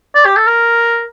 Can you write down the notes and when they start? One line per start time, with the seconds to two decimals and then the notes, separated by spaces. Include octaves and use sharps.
0.15 D5
0.25 G4
0.36 A4
0.47 A#4